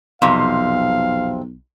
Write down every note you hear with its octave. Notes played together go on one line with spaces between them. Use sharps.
B1 F2 C3 F5